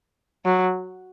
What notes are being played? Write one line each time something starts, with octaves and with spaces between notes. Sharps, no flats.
F#3